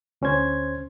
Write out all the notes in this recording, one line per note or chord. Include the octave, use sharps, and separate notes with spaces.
D2 C#4 C5 G#6